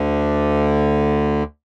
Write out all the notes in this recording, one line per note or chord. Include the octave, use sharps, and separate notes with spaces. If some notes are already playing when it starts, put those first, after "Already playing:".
Already playing: D2 D3